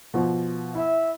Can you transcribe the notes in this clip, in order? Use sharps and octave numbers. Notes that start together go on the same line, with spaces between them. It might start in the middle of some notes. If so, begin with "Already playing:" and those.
B2 F3
E4 E5